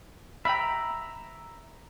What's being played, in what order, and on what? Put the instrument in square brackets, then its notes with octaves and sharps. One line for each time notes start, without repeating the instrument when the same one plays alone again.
[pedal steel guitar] E5 A#5 [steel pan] G5 B5